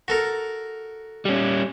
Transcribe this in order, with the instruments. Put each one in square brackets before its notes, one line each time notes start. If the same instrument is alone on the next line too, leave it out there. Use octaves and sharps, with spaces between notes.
[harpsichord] F#4 A4 A#4
[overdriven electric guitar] G3 C#4